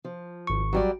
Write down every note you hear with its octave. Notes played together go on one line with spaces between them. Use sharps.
F3
G#1 C#6
F#3 G3 D5